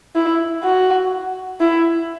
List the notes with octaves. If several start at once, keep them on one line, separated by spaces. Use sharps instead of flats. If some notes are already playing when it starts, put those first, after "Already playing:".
E4
F#4
E4